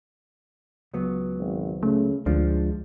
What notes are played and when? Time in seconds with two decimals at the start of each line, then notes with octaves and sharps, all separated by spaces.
0.93 C#2 F#3 B3
1.39 G#1
1.83 C#3 A3
2.26 D2 F3 G#3 D4